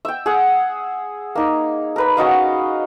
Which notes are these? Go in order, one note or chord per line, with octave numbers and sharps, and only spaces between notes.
E5 G5
G#4 F#5
A#3 D#4
A#4 B4 B5
C#4 F#4 D#5 F5